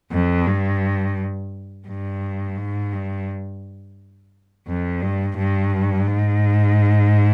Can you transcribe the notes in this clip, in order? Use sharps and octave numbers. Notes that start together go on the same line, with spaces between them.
F2
G2
G2
G#2
G2
F2
G2
G2
G#2